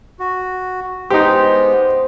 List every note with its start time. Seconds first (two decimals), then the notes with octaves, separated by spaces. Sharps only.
0.20 F#4
1.10 G#3 B3 D#4 G4 C5